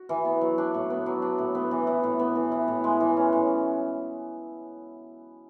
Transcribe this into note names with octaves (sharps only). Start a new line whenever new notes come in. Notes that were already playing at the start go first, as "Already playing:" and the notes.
Already playing: F#4
E3
B3
F#3
D4
A2
B3
F#3
D4
A2
B3
E3
E4
A2
B3
E3
E4
A2
G#3
E3
C#4
A2